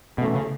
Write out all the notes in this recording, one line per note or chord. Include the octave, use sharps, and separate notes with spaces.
F#2 B2 E3 A3
C#3